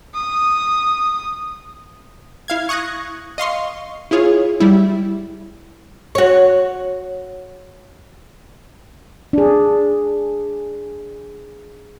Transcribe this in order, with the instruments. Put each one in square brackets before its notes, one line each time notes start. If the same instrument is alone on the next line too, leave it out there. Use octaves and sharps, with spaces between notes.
[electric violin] D#6
[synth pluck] E4 F5 G#6
C#6 D#6 F#6 G#6 A#6
D#5 F5 C6 C#6
E4 F4 G#4 C#5 F5
G3 E4
[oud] F#4 C#5
[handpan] D4 G#4